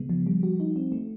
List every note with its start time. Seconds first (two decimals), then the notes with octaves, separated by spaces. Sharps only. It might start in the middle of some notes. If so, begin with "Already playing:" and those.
Already playing: C#3 G#3 B3
0.09 F3
0.27 G3
0.43 F#4
0.60 D#4
0.76 C4
0.92 A3